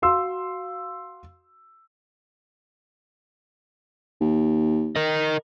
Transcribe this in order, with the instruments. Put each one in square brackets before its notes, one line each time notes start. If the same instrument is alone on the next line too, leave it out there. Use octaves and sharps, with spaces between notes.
[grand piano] F#4 F5 C6 E6
[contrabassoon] D#2
[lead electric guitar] A#4 D#5